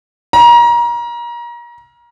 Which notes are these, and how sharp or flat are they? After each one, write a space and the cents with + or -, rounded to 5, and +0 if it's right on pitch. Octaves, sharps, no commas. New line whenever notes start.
A#5 +30